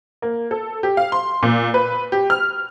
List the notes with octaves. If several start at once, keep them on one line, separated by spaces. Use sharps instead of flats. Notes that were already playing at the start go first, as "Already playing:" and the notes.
A#3
A4
G4
F5
C6
A#2
B4
G4
F6